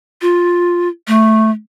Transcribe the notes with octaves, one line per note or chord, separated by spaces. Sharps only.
F4
A3